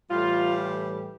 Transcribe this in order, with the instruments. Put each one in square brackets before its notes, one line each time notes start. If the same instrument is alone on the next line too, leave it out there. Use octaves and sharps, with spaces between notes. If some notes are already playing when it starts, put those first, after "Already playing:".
[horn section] A2 E3 G3 F4